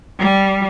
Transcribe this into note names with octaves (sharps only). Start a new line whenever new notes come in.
G3